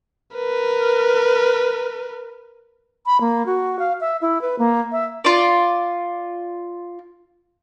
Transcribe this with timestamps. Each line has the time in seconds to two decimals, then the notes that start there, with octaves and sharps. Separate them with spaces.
0.35 A#4 B4
3.06 B5
3.21 A#3
3.46 F#4
3.79 F5
4.00 E5
4.21 E4
4.41 B4
4.58 A#3
4.92 E5
5.24 F4 D5